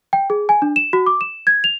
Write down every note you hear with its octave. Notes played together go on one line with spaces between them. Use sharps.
G5
G#4
G#5
D4
E7
F#4
D6
E7
G#6
F7